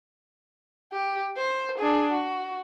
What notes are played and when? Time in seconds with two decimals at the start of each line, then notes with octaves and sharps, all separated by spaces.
0.93 G4
1.36 C5
1.78 D4 G#4
2.12 F#4